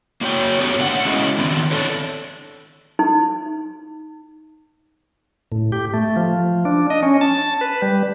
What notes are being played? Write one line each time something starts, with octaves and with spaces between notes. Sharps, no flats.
A#3 D4 F#4 C#5 G5
B3 D4 F#4 G4 B4 C#5
D3 A3 F5 F#5
G#3 C#4 E4 F#4 C#5 D#5
D#3 B3 C4
D4 A4 C#5
D#4
A2
G4
A3
F3
D4
D#5
C#4
A5
B4
G3